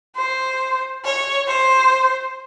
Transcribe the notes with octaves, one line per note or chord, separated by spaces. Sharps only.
C5
C#5
C5